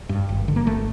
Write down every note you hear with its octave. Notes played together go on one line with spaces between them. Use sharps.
G2
G#1
D3
A#3
G#1 A3